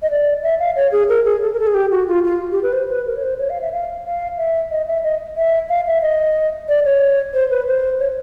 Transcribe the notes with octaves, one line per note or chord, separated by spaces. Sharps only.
D#5
D5
E5
F5
C#5
G#4
A#4
G#4
A4
A#4
A4
G#4
G4
F#4
F4
F4
G4
B4
C5
B4
A#4
C#5
C5
C#5
F5
E5
F5
F5
E5
D#5
E5
D#5
E5
F5
E5
D#5
D5
C#5
C5
B4
C5
C#5